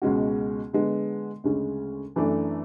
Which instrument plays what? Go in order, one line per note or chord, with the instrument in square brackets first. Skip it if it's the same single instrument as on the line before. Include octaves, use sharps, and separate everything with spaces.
[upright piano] C#2 B2 G#3 C#4 F#4
D3 G#3 B3
D2 C#3 G#3 C#4
F#2 E3 A3 D4 A4